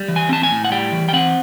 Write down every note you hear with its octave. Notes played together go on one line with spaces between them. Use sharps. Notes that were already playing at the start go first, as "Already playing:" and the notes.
Already playing: G3
E3
G#5
C4 A5
G#5
A2
F#5
G3 G5
E3
G5
C4 F#5